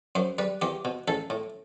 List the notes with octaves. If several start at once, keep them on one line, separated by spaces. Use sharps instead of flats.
F#2 C5
G3 B4
E2 G4
B2
A1 A4
A2